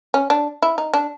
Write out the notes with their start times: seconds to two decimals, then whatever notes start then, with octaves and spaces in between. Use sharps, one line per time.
0.14 C#4
0.30 D4
0.62 E4
0.78 D#4
0.94 D4